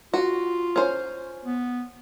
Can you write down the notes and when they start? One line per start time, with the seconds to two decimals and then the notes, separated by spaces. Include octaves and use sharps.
0.14 F4 F#4
0.76 C#4 C5
1.45 B3